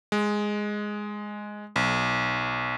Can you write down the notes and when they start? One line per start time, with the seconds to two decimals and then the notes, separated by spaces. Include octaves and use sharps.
0.12 G#3
1.76 B1